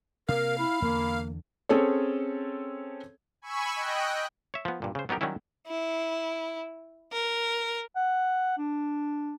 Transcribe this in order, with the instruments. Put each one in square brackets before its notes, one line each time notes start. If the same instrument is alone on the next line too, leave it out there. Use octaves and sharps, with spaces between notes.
[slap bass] C3 A#3 [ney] A#4 [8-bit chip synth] F5
[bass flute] E4 [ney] B5
[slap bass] E2 D3 [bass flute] A#3
[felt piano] C4 C#4 G#4 A4 C#5
[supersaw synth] G#5 B5 C#6 E6
D#5 G5 F#6
[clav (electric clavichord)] C#5 E5
F3 B3
G2 A#2
C#3 C5
F#3 B3 D#4 G4 A#4
D#3 F#3 G3 C#4 E4
[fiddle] E4
A#4
[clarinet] F#5
D4